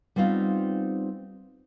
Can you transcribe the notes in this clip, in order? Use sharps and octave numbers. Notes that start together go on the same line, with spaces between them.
G3 B3 C4 D#4 F4